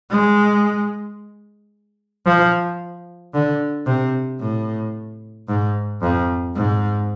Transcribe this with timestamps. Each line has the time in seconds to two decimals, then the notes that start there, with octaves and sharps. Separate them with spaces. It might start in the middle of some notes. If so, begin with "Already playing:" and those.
0.11 G#3
2.26 F3
3.34 D3
3.87 C3
4.41 A2
5.48 G#2
6.02 F2
6.56 G#2